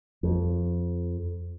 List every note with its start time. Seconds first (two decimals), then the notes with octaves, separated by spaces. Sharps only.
0.23 F2